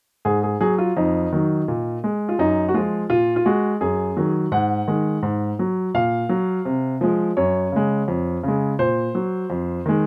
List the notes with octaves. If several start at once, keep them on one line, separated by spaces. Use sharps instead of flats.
G#2 G#4
G#4
F#3 G#4
F4
F2 D#4
D#3 F#3
A#2
G#3
F4
F#2 D#4
F#4
F3 G#3 F4
A#2 F4
F4
G#3 F#4
F#2 G#4
D#3 F#3
G#2 F#5
D#3 G#3
G#2
F#3
A#2 F5
F#3
C3
F3 G#3
F#2 C#5
C#3 G#3
F2
C#3 G#3
A#2 C5
F#3
F2
D#3 G#3